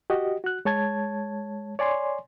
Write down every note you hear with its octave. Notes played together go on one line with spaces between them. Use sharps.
F#4 G4 D#5
F#4 F#6
G#3 C#5 A5 G#6
C#5 D5 G#5 C6